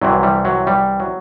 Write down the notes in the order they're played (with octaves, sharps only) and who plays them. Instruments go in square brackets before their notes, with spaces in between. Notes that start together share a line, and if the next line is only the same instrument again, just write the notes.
[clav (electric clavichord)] C2 C3 E3 F#3
G3
F#3
G3
F#3